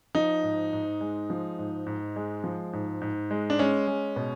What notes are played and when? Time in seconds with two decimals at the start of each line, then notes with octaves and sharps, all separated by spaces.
0.15 F3 D#4
0.43 G#2
0.73 G#2
1.01 G#3
1.30 F3
1.59 G#2
1.86 G#2
2.16 G#3
2.44 F3
2.73 G#2
3.01 G#2
3.31 G#3
3.50 D4
3.59 G#3 C#4
3.87 G#3
4.16 B2